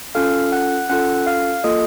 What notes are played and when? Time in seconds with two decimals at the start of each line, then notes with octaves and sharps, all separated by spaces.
0.15 C#4 F4 A4 F5 F6
0.52 F#5 F#6
0.89 C#4 F4 A4 F#5 F#6
1.27 F5 F6
1.64 A#3 F4 A4 D#5 D#6